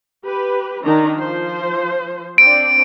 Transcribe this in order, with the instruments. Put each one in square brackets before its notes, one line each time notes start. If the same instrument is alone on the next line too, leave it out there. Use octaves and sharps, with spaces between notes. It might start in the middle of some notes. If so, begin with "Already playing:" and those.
[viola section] G4 B4
D#3 D4 A#5
F3 C5
[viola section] C4 D4 D5 [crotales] D7